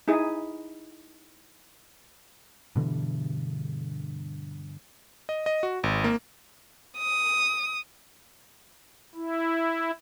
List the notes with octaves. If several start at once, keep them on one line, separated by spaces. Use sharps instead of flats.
D#4 E4 G#4
G2 B2 D3 E3
D#5
D#5
F#4
G#1
A#3
D#6
E4